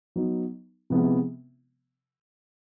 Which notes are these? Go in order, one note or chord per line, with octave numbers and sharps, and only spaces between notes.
F#3 B3 D#4
C3 F3 G#3 B3 E4